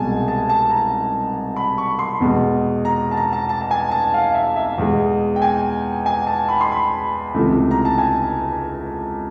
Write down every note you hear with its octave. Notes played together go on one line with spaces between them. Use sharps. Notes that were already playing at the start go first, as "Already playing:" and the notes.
Already playing: C2 B2 G#3 G#5 A5
A5
A5
A#5
B5
C#6
C6
E2 B2 G#3
A#5
A5
A#5
A5
A5
A5
G#5
A5
F5
E5
E5
E2 B2 G#3
G5
G#5
G#5
A5
B5
C6
B5
C#2 C3 E3 A3
A#5
A5
G#5